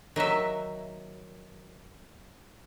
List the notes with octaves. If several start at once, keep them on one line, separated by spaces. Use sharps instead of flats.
D#3 F#3 D#5 E5